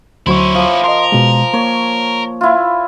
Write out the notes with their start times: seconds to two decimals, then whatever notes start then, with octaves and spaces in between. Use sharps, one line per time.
0.27 D2 F#3 C#4 E4 C5 C#6
0.55 F3 D6
0.84 A#4 D#5 C6
1.12 B2 G#3
1.54 A#3 C#5
2.41 E4 F4